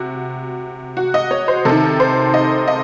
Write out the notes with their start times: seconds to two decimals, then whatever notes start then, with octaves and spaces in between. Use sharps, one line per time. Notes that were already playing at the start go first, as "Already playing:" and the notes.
Already playing: C3 F#4
0.97 F#4
1.14 D#5
1.31 C#5
1.48 C5
1.65 C3 D#3 A4
2.00 C5
2.34 D#5
2.68 D#5